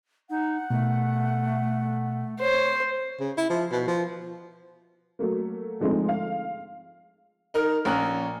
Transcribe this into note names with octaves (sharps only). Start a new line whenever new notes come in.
D#4 F#5
B2 A3
C5 C#5
C#3
E4
F3
B2
F3
F#3 A3 A#3
D3 F3 G#3 A3 C4 D#4
F5
D#4 A#4 F6
A#1 C#4 A#5 F#6